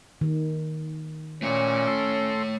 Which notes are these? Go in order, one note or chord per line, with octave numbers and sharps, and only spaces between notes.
D#3
A#2 A3 C#4 C#5
A4 C6